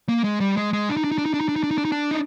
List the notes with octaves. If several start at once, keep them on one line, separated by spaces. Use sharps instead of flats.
A#3
G#3
G3
G#3
G#3
D4
D#4
D4
D#4
D4
D#4
D4
D#4
D4
D#4
D4
D#4
D4
D#4
D4
D#4